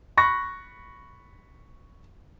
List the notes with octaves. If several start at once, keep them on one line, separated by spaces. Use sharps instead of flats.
B5 C#6 F#6 A#6